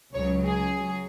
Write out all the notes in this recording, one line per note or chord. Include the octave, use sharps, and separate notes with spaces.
C#2 C#3 F#3 C#5
G#4
F#3